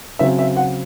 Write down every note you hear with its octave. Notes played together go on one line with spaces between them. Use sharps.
C#3 F#3 C4 E5
E5
F#5